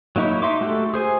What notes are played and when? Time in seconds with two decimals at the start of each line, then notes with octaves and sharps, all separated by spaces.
0.16 F#3 A#3 D#4 E4 C#6
0.42 D#4 E5 C6 D6
0.61 A3 F#4 G4 A4
0.94 G#4 C5 G#5